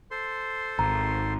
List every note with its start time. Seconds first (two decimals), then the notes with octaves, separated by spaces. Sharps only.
0.11 A4 C5 C6
0.79 G#1 A#5